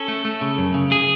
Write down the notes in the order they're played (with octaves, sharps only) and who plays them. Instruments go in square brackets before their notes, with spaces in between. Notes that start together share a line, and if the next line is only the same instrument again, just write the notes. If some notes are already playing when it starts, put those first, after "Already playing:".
Already playing: [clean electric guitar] C#4 A4
A3
A3
C#3
F#2
C#3
G#4